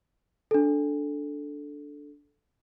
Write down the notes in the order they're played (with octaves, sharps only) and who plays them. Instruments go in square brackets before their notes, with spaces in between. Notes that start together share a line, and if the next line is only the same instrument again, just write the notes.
[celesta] D4 A4